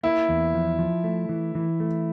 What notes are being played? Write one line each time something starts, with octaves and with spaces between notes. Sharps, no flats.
A#3 E4
E2
F3
F3
A3
E3
E3
A3